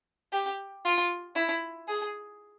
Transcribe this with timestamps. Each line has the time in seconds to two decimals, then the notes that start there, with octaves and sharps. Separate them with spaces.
0.33 G4
0.85 F4
1.36 E4
1.88 G#4